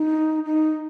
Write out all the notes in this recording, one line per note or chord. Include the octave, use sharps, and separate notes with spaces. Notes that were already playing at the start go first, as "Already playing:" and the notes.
Already playing: D#4
D#4